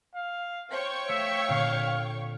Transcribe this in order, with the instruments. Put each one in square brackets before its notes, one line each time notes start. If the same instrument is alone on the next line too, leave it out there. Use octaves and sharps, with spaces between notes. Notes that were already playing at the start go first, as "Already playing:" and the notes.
[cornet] F5
[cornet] C5 [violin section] C#5 G5 C#6
[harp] A3 F5 E6 [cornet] E5
[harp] A#2 D3 C4 [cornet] F5